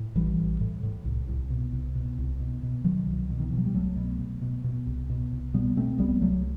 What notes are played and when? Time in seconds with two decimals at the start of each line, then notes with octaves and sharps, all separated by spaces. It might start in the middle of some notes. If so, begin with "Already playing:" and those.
Already playing: A2
0.15 A1 E3 G3
0.38 A1
0.61 A2
0.83 A2
1.05 C2
1.28 C2
1.50 B2
1.72 C2
1.95 B2
2.18 C2
2.40 B2
2.63 B2
2.84 B2 D#3 F#3
3.07 C2
3.30 B2
3.40 D#3
3.49 E3
3.52 B2
3.58 F#3
3.66 G3
3.74 C2 F#3 A3
3.96 B2
4.19 B2
4.42 B2
4.64 B2
4.86 C2
5.10 B2
5.32 C2
5.54 B2 G3 B3
5.77 B2 A3 C4
5.98 C2 G3 B3
6.21 C2 F#3 A3